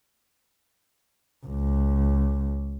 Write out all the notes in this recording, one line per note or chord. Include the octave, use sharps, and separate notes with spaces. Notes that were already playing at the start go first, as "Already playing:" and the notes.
C#2